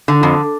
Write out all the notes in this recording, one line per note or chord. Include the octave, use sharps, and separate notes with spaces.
D3
F2